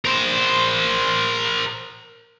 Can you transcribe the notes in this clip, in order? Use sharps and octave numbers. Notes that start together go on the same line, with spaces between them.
A#4 C5